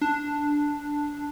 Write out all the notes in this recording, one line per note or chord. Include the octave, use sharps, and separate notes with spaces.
D4